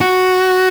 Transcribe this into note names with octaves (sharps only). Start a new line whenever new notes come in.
F#4